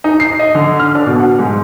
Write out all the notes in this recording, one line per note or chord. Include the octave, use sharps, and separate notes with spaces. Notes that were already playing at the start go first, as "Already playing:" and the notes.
D#4
C7
D#5
D3
F6
D4
B2
F#5
G#2